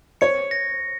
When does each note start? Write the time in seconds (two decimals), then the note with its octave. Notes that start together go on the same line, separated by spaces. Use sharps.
0.21 C#5 C#7
0.51 A#6